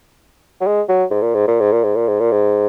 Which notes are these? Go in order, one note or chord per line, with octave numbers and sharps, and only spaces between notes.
F#3
G#3
F#3
G#2
A#2
G#2
A#2
G#2
A#2
G#2
A#2
G#2
A#2
G#2